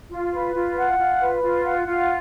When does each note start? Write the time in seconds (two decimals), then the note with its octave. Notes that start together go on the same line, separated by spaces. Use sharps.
0.10 F4
0.32 B4
0.55 F4
0.77 F#5
0.98 F4
1.20 B4
1.42 F4
1.65 F#5
1.87 F4